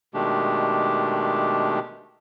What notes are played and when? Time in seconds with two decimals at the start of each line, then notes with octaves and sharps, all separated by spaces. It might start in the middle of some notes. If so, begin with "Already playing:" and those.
0.14 B2 D#3 G#3 A3 D4 G4